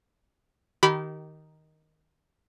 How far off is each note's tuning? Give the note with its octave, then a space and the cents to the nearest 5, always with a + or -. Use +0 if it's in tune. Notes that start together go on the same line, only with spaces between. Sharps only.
D#3 +0 G4 -30 B5 +0